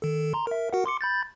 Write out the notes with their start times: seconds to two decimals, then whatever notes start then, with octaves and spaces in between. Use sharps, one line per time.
0.02 D#3 A4
0.34 A#5 C6
0.47 A#4 E5
0.73 F#4 A#4 F#5
0.86 C6 D6 C#7
1.01 B5 G6 A6